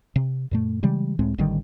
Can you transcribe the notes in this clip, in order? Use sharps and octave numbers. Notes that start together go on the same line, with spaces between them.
C3
F#2 A#2 A3
C#3 E3 G3 G#3
C#2 A2 G#3 C4
A1 D3 D#3 G3